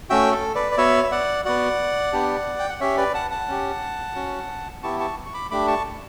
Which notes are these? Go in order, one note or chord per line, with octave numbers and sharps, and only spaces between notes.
A3 C#4 F#4 E5 G5
A4
B4 D5
D5
B3 F#4 C#5 E5
E5
D5 F#5
B3 F#4 D5 F#5
B3 D4 G4
G5
F#5
C#4 G4 C#5 E5
B4 D5
F#5 A5
F#5 A5
C#4 G4
C#4 F#4
B3 E4 G4 A5 C#6
A5 C#6
C#6
B5 D6
A3 D4 G4 B5 D6
A5 C#6